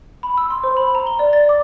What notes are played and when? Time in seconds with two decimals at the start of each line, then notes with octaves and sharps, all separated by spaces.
0.23 B5
0.38 E6
0.50 C6
0.63 C5
0.77 B5
0.95 A#5
1.07 G7
1.19 D5
1.33 A6
1.49 D6